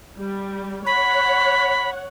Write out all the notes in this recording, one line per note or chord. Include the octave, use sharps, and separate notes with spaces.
G3
C#5 F#5 B5